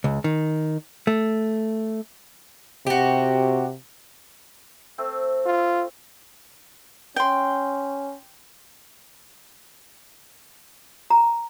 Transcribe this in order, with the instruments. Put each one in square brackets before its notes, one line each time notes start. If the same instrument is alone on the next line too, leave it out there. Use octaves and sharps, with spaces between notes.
[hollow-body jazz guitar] C#2
D#3
A3
[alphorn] C3 [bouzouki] F#4 G4
[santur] A3 C4
[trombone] F4
[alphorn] C#4 [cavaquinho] G5 C6
[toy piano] A#5